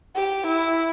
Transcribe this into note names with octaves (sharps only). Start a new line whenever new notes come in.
G4
E4